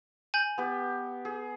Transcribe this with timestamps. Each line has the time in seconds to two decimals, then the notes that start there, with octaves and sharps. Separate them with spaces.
0.34 G#5 G6 F#7
0.58 B3 G4
1.25 G#4